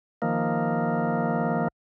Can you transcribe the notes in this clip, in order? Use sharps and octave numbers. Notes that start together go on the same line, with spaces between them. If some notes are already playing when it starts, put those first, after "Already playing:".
D#3 F3 A#3